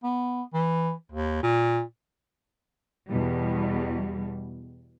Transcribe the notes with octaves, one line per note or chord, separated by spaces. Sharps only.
B3
E3
D#2
A#2
E2 B2 G3